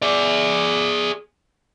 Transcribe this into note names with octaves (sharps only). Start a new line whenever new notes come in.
G#4 D5